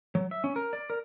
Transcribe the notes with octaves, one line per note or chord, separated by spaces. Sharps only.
F#3
E5
C#4
A#4
D5
A#4